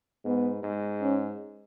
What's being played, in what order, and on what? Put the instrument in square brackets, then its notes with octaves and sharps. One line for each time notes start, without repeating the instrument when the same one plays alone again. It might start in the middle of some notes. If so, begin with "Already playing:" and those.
[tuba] G#2 [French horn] B3
[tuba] G#2
[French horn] C#4